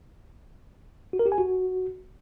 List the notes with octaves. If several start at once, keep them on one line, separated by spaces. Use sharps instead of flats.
F#4
A#4
G4
G#5
F#4